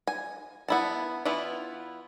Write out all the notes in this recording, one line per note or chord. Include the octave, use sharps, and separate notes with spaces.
G#5
B3 E4 A5
E3 B3 E4 F4